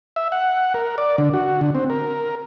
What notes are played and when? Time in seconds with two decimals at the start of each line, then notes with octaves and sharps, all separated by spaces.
0.16 E5
0.32 F#5
0.74 A#4
0.98 D5
1.18 D3
1.34 F#4
1.61 D3
1.75 C4
1.90 A#4